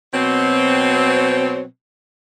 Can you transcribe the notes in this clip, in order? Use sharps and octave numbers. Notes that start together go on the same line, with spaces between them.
B2 F#3 C4